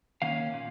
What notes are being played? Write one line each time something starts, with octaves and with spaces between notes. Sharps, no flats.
D#3 A#3 C#4 F5
A#2